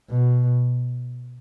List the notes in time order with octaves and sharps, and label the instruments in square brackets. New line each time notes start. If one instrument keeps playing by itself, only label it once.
[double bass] B2